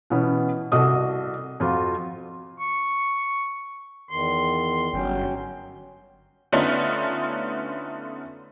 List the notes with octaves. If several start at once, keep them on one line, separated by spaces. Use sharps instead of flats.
B2 E3 B3 C#4
C2 F#4 A4 D#5 D#6
F2 F4 F#4
C#6
E2 D#3 C6
G1 F#3 C#4 G5
D3 A3 B3 C#4 D#4 F4